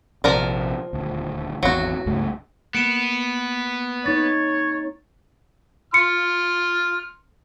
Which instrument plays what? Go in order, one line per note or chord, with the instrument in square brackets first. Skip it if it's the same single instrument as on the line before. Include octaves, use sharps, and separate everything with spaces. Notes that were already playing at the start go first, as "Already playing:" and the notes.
[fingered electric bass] A#1 C3 [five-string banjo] F3 A#4 D5
[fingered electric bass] D#1 D2
[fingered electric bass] G#1 E2 C4 [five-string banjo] F#3 F#4
[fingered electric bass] C#2 G2 A3
[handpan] A#3 [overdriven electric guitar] B3 [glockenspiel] C#7 D7 E7
[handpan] C4 D#4 [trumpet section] C#5 [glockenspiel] A6
[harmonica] C6 F6 [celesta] C#7